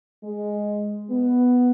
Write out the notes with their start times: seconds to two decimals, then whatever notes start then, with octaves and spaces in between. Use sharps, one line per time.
0.24 G#3
1.11 B3